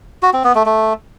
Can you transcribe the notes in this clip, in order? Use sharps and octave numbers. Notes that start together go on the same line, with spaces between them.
F#4
C4
B3
A3
A3